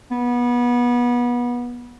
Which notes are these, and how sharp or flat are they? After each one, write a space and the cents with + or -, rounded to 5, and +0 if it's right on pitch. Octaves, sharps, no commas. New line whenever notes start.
B3 -25